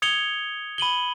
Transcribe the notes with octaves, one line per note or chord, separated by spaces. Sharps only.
D#6 G#6 C#7 F7 G7
B5 D#7 F#7 G7